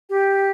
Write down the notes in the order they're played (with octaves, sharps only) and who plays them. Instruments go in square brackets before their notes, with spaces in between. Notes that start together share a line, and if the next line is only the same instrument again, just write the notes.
[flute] G4